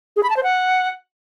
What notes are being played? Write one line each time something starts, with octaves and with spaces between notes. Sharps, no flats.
G#4
B5
A5
C5
F#5